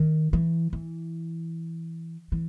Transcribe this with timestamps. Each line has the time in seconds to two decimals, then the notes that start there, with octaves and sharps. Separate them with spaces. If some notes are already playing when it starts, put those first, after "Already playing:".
Already playing: D#3
0.33 E3
0.73 E3
2.32 E3